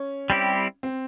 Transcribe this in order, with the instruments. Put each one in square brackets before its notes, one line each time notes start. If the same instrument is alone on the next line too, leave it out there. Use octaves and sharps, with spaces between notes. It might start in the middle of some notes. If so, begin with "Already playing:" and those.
Already playing: [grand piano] C#4
[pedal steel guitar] G3 C4 E4 G4
[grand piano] C4